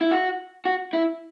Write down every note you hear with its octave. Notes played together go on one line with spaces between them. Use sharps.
E4
F#4
F#4
E4